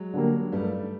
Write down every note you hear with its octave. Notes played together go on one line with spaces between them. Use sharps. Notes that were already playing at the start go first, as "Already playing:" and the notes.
Already playing: F#3 G#3
D3 G3 A#3
G2 G3 A3
G3 A3